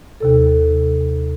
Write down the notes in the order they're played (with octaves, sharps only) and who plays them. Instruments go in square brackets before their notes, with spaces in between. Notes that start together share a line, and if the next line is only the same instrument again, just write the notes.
[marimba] D#2 C3 A4